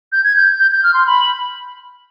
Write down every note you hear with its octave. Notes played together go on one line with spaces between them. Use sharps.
G6
G#6
G6
G6
G6
F6
C6
B5